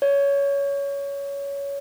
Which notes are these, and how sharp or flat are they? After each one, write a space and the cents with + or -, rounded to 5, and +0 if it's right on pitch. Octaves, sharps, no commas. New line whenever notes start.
C#5 +15